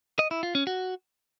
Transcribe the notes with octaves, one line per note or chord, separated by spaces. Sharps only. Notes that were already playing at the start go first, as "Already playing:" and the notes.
D#5
E4
F4
C#4
F#4